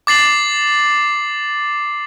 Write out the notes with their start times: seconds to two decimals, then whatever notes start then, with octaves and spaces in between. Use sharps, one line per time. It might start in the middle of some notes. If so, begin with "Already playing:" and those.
0.07 D6 A6 C7 F#7